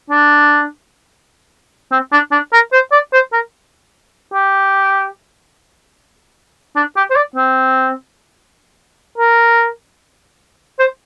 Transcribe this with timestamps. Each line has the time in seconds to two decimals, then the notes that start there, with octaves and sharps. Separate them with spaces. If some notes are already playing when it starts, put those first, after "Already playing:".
0.10 D4
1.92 C4
2.12 D4
2.32 D4
2.53 A#4
2.72 C5
2.92 D5
3.13 C5
3.33 A#4
4.33 G4
6.76 D4
6.96 G4
7.10 C5
7.16 D5
7.36 C4
9.18 A#4
10.79 C5